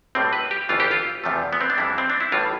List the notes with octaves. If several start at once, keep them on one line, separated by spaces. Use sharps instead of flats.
B1 A2 G3 C4
B4
G4
G1 F2 E3 A3 F4
G4
F4
E2 C3 F3 A3
B3
C4
D4
F2 E3 G3 E4
C4
D4
E4
A1 A2 G3 F4